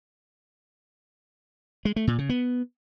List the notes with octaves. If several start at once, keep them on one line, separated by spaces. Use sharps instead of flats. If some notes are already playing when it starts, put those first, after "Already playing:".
G#3
A3
A#2
C#3
B3